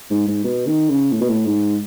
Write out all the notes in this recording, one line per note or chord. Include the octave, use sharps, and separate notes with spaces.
G#2
G#2
B2
D#3
C#3
A2
B2
A2
G#2